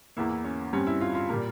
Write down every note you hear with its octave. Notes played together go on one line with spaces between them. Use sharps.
E2 E3 A#3 E4
E4
C#4
G2 G3 C4 C#4
E4
F4
F4
A#2 G3 A#3 A#4